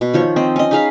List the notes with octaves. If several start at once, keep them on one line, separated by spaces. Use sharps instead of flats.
B2
D#3 F3 C#5
C4 D#5
C#4 D#5
D#4 G#4 F5 B5